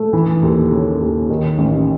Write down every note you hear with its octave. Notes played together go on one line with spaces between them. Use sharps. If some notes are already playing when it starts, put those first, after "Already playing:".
Already playing: A3
E3
D#2
C#3
D#2
D#3
A1